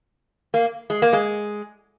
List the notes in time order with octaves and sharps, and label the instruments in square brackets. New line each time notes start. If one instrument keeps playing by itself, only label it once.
[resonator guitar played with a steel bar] A#3
G#3
A#3
G#3